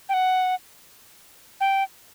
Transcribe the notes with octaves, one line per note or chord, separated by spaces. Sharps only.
G5
F#5
G5